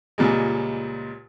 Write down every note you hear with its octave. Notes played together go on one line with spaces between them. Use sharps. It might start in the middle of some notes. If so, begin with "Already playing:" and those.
C#2 A#2 G3 G#3